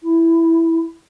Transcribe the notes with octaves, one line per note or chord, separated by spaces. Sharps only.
E4